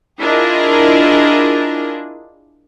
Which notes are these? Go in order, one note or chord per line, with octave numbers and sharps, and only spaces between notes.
D4 E4 F4 G#4 A#4 D#5